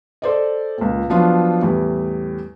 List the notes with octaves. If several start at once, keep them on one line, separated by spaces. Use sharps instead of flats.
A4 C5 D5 D#5
C#2 A#2
F3 F#3 B3 D4 F4
E2 A2 G3